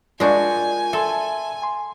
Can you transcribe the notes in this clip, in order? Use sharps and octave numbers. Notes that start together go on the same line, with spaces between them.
G#3 D4 F4 F#4 A#4 G#5 G6
A4 E5 A5 C6
G#5 C6